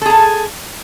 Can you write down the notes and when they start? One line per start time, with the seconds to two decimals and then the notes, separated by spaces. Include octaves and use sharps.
0.02 A4
0.06 G#4
0.10 A5